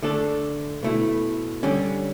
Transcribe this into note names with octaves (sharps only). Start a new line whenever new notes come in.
D3 A3 D4 A4
B2 A3 E4
D3 G3 C#4